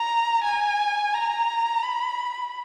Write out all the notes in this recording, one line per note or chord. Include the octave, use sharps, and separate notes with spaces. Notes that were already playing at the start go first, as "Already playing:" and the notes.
Already playing: A#5
G#5
A#5
B5